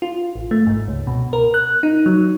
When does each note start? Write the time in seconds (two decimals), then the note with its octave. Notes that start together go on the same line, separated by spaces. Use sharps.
0.02 F4
0.35 A1
0.51 A3
0.67 G#2
0.88 C#2
1.07 B2
1.33 A#4
1.54 F#6
1.83 D#4
2.06 F#3